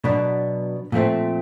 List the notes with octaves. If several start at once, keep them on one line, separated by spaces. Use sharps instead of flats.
B2 F#3 B3 D4
A#2 F3 A3 C4